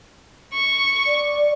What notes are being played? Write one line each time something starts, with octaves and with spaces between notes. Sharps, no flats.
C#6
D5